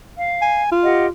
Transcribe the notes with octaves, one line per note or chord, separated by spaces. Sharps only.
F5
G#5
F4
G4 D#5 F#5